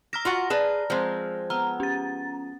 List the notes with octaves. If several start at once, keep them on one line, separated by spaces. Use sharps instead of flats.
A#5 D6 F6 A#6
F4 F#4 F#5
G#4 B4 D5 A5
F3 G#3 C4
B3 A#5 F6
C#4 A6